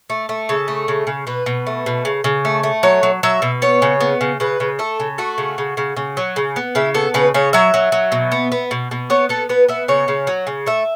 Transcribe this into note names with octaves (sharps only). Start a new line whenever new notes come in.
A3
A3
C#3 A4
A3
C#3
C#3
B2 B4
B2
A3
B2
C#3
C#3
A3
A3
F#3 C#5
F#3
F#3 E5
B2
B3 C#5
C#3
B3
C#3
C#3 B4
C#3
A3 A4
C#3
A3 F#4
C#3
C#3
C#3
C#3
F#3
C#3
B3
C#3 E4
B3 A4
C#3 B4
C#3 C#5
F#3 E5
F#3
F#3
B2
B3
B3
B2
B2
B3 C#5
B3 A4
B3 B4
B3 E5
C#3 C#5
C#3
F#3
C#3
A3 E5